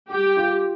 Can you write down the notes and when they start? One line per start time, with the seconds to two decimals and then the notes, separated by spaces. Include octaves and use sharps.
0.08 G3 G4
0.37 F4